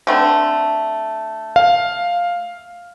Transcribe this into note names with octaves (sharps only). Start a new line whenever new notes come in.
D3 A3 C4
F5